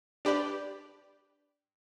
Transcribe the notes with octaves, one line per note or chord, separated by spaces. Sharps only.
D4 G4 B4 D5